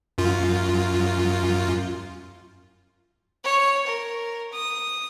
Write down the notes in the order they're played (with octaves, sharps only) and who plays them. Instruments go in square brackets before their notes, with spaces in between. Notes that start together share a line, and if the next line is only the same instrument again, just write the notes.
[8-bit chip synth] F#2 F4
[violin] C#5
A#4
D#6